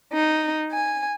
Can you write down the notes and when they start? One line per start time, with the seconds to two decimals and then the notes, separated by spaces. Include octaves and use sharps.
0.14 D#4
0.72 G#5